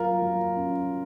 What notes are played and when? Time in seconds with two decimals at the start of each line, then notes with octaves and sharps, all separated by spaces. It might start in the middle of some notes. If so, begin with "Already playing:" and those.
Already playing: F#3 F4 A#4
0.22 F#3
0.57 C#4